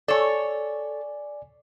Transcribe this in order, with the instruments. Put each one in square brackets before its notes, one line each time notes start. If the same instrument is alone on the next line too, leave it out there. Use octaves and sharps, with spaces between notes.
[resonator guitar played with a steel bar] A4 C#5 [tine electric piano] D5 G#5